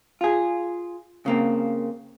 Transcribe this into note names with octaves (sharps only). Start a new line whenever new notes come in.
F4 G#4
C#3 A#3 C4